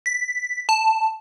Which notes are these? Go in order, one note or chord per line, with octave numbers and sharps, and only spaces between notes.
B6
A5